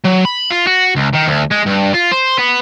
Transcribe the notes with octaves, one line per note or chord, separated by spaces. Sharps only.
F#3
B5
F4
F#4
C#2
D#3
D2
G#3
G2
F4
C5
B3